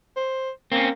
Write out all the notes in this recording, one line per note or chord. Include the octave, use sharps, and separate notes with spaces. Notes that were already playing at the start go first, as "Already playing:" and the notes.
C5
A#3 C4 C#4